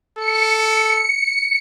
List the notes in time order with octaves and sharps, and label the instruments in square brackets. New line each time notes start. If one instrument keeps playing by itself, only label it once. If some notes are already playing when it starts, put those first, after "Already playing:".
[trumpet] A4 [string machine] C#7